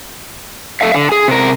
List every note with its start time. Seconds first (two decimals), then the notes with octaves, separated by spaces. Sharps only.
0.81 A4 E5 F5
0.95 D3
1.12 G#4
1.28 C3 A#4